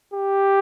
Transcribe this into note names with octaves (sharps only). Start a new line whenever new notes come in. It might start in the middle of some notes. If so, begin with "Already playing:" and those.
G4